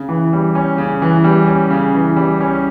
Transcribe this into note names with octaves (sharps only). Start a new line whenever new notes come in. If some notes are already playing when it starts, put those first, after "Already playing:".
Already playing: C#3
E3
G3
C#4
C#3
E3
G3
C#4
C#3
E3
G3
C#4